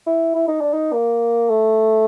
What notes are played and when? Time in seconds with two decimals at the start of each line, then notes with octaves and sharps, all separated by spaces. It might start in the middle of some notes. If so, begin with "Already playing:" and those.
0.06 E4
0.35 E4
0.48 D#4
0.61 D4
0.73 D#4
0.93 A#3
1.49 A3